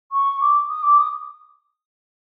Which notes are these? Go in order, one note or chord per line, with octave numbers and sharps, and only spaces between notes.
C#6
D6
D#6
D6
D#6